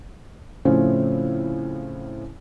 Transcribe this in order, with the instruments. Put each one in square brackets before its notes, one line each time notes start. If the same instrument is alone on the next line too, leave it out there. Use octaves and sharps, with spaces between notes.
[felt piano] A2 C#3 F3 A3 C4 C#4